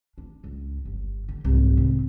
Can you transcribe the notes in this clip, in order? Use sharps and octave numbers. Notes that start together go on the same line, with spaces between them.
D4
C#2
G1
D3
C2 G#2
G#2 C3